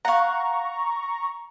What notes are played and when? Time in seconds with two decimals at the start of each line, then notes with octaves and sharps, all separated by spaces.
0.05 F5 F#5 A#5 C#6